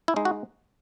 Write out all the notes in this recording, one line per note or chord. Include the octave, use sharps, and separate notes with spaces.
E4
G#3 D#4
F#4